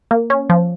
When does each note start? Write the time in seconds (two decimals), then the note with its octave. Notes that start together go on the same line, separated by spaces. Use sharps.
0.11 A#3
0.30 C#4
0.50 F3